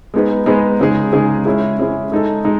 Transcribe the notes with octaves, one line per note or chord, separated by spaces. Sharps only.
G#3 B3 D#4 G#4 B4
G#3 B3 D#4 G#4 B4
C#3 G#3 D#4 G#4
C#3 G#3 D#4 G#4
G#3 C#4 E4 G#4
G#3 C#4 E4 G#4
G#3 D#4 A4
G#3 D#4